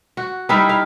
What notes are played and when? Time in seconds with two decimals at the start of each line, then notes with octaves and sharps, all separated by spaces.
0.17 F#4
0.49 G3 D#4 E4 F5
0.69 F5